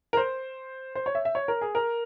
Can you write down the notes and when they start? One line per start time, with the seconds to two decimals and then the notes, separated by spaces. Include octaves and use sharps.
0.13 A#4
0.17 C5
0.95 C5
1.06 C#5
1.15 E5
1.25 E5
1.35 C#5
1.48 A#4
1.61 G#4
1.75 A#4